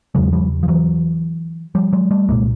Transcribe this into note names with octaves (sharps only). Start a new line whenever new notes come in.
E2 C#3 F#3 G#3
F3 G3
F3
E3 F#3
F3 G3
F#3 G#3
G3 A3
C2 A#2 G#3 A#3